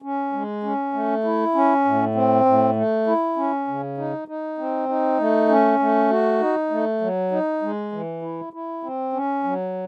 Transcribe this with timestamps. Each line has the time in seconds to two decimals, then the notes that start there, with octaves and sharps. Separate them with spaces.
0.02 C#4
0.33 G#3
0.63 C#4
0.93 A3
1.24 E4
1.55 C#4
1.85 A2
2.15 C4
2.45 A2
2.76 A3
3.07 E4
3.36 C#4
3.68 C#3
3.98 D#4
4.28 D#4
4.58 C4
4.89 D#4
5.19 A3
5.49 C#4
5.79 A3
6.10 F#4
6.40 D#4
6.70 A3
7.01 F#3
7.31 D#4
7.62 G#3
7.92 E3
8.22 E4
8.53 E4
8.83 C4
9.13 C#4
9.44 F#3